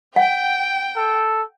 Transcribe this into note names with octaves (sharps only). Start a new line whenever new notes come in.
F#5 G5
A4